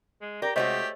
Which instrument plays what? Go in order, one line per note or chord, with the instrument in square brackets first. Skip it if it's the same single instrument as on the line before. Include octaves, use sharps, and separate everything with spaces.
[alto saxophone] G#3
[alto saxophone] G4 [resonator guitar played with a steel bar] A#4 [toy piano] D5 [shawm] A#5
[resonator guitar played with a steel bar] C3 G#3 F#4 [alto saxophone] A3 [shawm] G4 [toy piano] C5 C#5 D#5